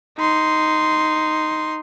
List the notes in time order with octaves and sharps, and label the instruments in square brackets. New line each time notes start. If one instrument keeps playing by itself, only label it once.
[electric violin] D#4 C6